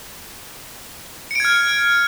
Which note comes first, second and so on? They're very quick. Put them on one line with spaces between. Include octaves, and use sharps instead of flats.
C#7 D7 G#6 F6